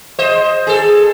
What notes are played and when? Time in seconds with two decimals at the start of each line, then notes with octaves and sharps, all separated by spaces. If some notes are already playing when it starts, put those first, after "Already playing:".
0.19 C5 D#5
0.67 G#4 A4